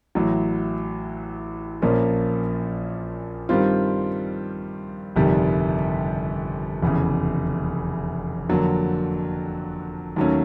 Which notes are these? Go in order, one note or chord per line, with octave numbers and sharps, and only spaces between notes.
A1 A2 F#3
A#1 A#2 F3 A#3 C#4
G2 D#3 G3 C4 F4
G1 F2 C3 D#3 G3
F1 E2 C#3
F2 D3 F#3 A#3
D#2 D#3 F#3 A3 C#4